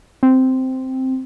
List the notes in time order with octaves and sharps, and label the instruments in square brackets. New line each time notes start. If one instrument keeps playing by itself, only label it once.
[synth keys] C4